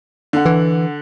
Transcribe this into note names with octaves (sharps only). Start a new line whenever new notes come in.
D3 F#5
E3